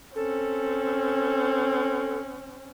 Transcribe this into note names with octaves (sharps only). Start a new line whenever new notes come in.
C4 C#4 A4